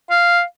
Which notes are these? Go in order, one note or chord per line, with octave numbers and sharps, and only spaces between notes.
F5